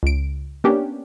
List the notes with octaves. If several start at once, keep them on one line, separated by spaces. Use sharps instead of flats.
C#2 D7
A#3 B3 C#4 D4 G4